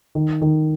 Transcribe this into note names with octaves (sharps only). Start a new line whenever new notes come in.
D#3
D#3